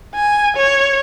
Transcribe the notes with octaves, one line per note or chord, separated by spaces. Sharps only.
G#5
C#5